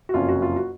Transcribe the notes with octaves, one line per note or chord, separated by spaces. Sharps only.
F#4
F#1 F2 C3 F#3 C#4 F4
F#4
F4
F#4